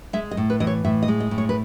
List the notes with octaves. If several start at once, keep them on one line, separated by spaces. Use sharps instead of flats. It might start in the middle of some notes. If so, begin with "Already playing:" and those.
G#3 E5
D#5
A2
B4
E3 D#5
C#5
A2 E5
D#5
G#3
D#5
A2
C#5
B4